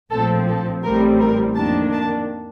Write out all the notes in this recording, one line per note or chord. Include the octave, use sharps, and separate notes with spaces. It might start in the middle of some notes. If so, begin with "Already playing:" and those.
A#1 A2 F3 C4 A4
A4
A1 A2 G3 C4 A#4
A#4
F2 D#3 A#3 D4 A5
A5